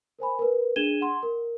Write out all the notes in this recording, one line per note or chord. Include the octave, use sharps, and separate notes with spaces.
A#4 C5 G#5 B5
A#4 B4
D4 G#4 G#6 D#7 E7 G7
F#5 C6
A#4